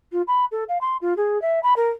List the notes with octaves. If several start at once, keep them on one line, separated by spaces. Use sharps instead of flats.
F4
B5
A4
F5
C6
F4
G#4
E5
B5
A#4